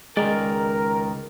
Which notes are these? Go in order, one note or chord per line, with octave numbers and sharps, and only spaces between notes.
C#2 D#3 G#3 A#4 D5